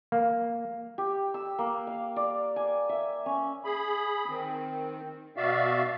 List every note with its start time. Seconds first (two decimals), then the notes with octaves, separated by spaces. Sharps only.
0.12 A#3
0.98 G4
1.34 E6
1.59 A#3
1.87 F5
2.16 D5
2.56 G#5
2.89 E5
3.26 C#4
3.65 G#4 B5
4.29 D#3 C4
5.37 B2 F#4 D5 E5 F5